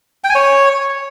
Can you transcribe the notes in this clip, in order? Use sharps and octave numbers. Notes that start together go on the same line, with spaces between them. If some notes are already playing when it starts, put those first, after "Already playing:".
G5
G#5
C#5